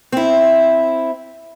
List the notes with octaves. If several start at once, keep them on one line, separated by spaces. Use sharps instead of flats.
C4 E4